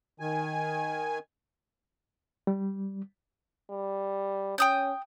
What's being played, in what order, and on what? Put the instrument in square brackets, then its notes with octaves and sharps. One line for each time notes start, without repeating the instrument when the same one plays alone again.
[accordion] D#3 G#5
[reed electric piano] G3
[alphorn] G3
[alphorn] C#4 [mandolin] G5 D#6 G6